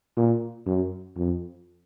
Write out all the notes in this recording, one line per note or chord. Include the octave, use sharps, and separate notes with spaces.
A#2
F#2
F2